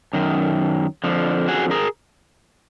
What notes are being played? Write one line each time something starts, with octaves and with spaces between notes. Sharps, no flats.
F#2 D#3
F2 D3 F3
F#4 G#4
G#4 A#4